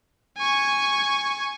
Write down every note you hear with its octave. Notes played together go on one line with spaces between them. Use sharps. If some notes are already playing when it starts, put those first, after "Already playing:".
G#5 C#6